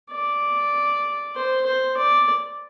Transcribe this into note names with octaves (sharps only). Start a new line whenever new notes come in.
D5
C5
C5
D5